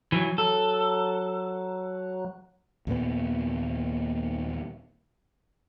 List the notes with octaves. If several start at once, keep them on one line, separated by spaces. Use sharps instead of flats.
E3 F#3
F#3 A4
D#2 A#2 B3